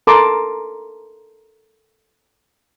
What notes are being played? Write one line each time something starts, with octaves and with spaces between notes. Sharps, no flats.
A4 A#4 A5 A#5 C6 D6